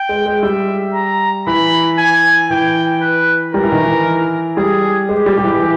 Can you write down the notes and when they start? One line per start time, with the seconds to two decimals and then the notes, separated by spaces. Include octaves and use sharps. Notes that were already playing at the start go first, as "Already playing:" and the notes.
Already playing: G5
0.09 G#3
0.26 G#3
0.43 G3 E5
0.94 A#5
1.47 E3 B5
1.99 G#5
2.50 E3 G5
3.02 B4
3.54 G3 A#4
3.63 E3
3.72 D#3
3.82 E3
4.57 G3 G#4
5.09 G#3 G4
5.26 G3
5.38 G3
5.44 E3
5.60 E3